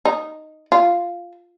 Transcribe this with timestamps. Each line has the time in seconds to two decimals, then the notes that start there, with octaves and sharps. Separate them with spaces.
0.05 D#4
0.72 F4